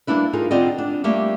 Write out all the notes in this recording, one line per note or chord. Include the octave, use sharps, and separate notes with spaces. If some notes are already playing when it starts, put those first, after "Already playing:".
G3 A#3 D4 E4 B4
D#4 F4 G#4 A#4
D3 C4 F4 G4 D5 D#5
D4
G3 A3 A#3 G4